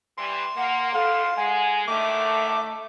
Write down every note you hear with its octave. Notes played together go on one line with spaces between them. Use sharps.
E3 G3 C6
A#3 F#5
F2 A2 F3 A4 F5
G#3 F#5 G#5
A2 D3 D#3 A3 E5 D6